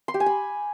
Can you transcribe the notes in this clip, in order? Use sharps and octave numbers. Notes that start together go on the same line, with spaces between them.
C6
G4
G#5
B5